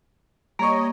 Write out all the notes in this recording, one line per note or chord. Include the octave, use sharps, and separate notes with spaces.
G3 A#3 C#5 D#5 A#5 C#6